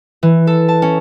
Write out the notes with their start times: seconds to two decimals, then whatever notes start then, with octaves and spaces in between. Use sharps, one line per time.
0.23 E3
0.47 A4
0.68 A5
0.82 C#4